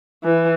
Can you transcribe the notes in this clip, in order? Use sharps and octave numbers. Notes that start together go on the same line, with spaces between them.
E3